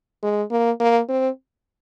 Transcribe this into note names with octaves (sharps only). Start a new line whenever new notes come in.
G#3
A#3
A#3
C4